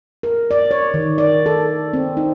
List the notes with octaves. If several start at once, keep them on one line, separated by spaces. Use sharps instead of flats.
A#4
D5
C#5
D#3
D5
A4
C4
D#4